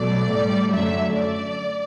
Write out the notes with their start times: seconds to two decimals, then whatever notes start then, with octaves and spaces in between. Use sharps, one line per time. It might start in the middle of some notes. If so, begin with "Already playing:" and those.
Already playing: B2 F#3 A3 D5
0.31 A2
0.36 G3
0.73 F#2 D3 F#3 A3 E5
1.15 D5